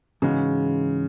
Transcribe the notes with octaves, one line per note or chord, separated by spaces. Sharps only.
G#2 C#3 E3 G#3 D#4 F#4